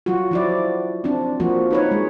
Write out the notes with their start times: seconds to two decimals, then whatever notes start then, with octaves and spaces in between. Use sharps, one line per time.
0.06 F#3 F4 F#4
0.31 F3 E4 D5
1.04 C4 D4
1.40 F3 A#3 F4 F#4
1.71 D#4 B4 C#5
1.91 G#3